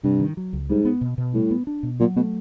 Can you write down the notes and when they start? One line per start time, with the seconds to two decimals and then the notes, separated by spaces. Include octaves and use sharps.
0.04 G2 C3
0.20 D#3
0.37 F#3
0.53 C#2
0.70 G#2 G3
0.85 B3
1.01 B2
1.18 B2
1.34 A2 G3
1.51 B3
1.67 D4
1.83 B2
2.00 A#2 F#3
2.16 B2 A3